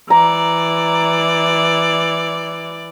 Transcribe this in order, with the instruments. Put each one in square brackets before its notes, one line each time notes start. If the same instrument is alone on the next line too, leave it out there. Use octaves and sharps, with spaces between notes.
[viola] E3 D5 [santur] A#5